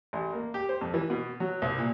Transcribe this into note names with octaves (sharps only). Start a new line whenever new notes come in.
A1
A#3
G4
C5
F2
E3
B2
F#3
C2
A#2